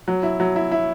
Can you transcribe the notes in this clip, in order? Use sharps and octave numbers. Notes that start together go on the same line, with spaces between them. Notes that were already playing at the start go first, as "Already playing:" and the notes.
F#3
E4
F#3
E4
E4